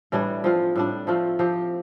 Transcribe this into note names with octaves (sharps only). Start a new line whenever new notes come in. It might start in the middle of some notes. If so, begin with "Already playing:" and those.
A2 E3 G3 D4
F3 C4 F4
A2 G3 D4
F3 A3 C4 F4
F3 C4 G4